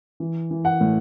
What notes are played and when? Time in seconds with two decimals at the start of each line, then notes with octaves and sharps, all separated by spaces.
0.20 E3
0.51 E3
0.65 F#5
0.81 A2